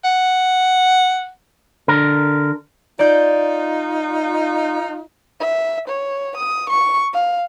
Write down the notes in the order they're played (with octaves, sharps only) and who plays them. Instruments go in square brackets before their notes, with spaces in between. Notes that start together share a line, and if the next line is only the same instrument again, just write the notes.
[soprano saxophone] F#5
[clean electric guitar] D3 A#4
[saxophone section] D#4 F4 [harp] D5 G6
[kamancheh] E5
C#5
D#6
C#6
F5